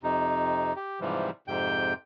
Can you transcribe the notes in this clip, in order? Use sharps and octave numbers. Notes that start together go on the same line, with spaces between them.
F2 C3 D#4
G4
G#2 C3 E3 F3 G3
F2 G#2 C3 G5 G6